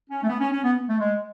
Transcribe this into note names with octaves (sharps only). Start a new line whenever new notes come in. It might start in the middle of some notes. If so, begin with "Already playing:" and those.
C#4
A3
B3
C#4
C#4
B3
A3
G#3